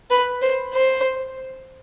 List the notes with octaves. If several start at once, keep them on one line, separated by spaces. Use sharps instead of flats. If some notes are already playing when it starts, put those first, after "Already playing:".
B4
C5
C5